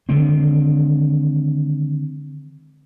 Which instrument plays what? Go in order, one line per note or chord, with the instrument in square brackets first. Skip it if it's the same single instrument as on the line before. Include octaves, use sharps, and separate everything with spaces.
[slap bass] D3 D#3 G#3 C4